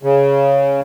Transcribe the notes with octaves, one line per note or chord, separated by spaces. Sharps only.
C#3